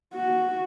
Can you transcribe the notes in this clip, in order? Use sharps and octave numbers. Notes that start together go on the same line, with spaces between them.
F#4